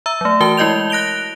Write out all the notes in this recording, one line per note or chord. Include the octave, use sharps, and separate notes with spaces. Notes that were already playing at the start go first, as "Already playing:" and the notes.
E5 A#5 E6
F#3 A3
E3 F#4 A#4 A5 G7
G#3 E4 A#4 D#5 G6 F7
F#6 A#6 D7 F7 G7